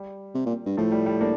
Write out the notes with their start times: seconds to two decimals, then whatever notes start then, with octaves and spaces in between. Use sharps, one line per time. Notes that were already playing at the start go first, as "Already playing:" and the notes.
Already playing: G3
0.34 C3
0.46 A#2
0.66 G2
0.77 A2 F3 A3
0.92 G3
1.06 G3
1.21 A#3 D4